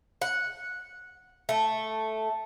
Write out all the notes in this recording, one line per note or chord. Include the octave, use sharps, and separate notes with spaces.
F#5
A3